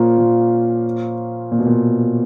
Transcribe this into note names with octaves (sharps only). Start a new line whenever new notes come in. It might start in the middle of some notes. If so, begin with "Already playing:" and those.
Already playing: A#2 F3 A#3 C#4 F4
A#2
A#2
B2
A#2